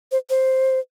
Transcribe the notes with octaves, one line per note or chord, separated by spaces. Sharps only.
C5
C5